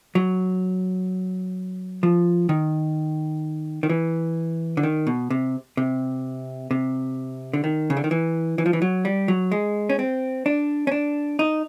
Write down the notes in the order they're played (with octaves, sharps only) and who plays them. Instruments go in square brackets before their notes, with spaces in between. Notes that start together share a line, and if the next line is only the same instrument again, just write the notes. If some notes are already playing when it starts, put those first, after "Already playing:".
[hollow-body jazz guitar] F#3
F3
D#3
D#3
E3
D3
D#3
B2
C3
C3
C3
D3
D#3
C#3
D3
D#3
E3
E3
F3
E3
F#3
G3
F#3
G#3
C#4
C4
D4
C#4
D4
D#4